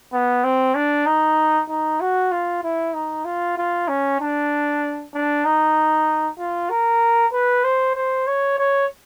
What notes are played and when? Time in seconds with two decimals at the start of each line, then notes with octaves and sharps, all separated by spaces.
0.13 B3
0.44 C4
0.75 D4
1.06 D#4
1.69 D#4
2.00 F#4
2.32 F4
2.64 E4
2.94 D#4
3.25 F4
3.58 F4
3.89 C#4
4.20 D4
5.14 D4
5.45 D#4
6.39 F4
6.70 A#4
7.32 B4
7.64 C5
7.96 C5
8.27 C#5
8.58 C#5